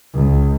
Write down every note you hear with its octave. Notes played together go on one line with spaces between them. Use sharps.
C#2